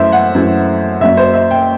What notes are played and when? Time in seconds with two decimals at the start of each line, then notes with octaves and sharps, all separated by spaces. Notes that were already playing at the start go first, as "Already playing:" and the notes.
Already playing: F#2 E3 A3 C5 E5
0.12 F#5
0.35 F#2 E3 A3
1.00 F#1 F#2 F#3 E5
1.17 C5
1.34 E5
1.51 G5